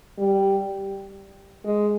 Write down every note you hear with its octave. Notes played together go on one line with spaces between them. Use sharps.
G3
G#3